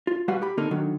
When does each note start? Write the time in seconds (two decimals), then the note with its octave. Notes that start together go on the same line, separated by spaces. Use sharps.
0.07 F4
0.28 G3 G#3 F#4 B4 F5 F#5
0.42 G4 B5
0.57 D3 A#3 C4 D#4 A4 A#4
0.71 D3 D#3 F#3